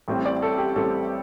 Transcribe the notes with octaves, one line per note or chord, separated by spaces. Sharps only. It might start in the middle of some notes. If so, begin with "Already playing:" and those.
A1 A2 G3 C4
D5
A4
G4
A1 A2 G3 C4 A4